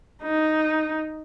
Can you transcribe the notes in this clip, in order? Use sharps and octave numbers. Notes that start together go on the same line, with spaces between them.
D#4